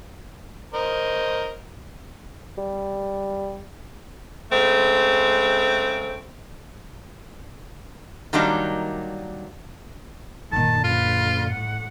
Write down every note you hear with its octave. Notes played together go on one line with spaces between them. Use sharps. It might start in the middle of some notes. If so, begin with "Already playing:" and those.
A#4 C5 D#5
G3
C#3 G#3 A3 C4
D#3 F#3 G3 A#3 D4 D#4
F#2 A#2 D#3 A5
D3 F4 B4
A2 F#5